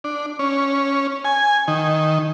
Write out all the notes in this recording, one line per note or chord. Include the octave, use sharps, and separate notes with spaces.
D4
C#4
G#5
D#3